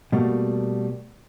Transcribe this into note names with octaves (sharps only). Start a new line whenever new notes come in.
B2 G3 A3 A#3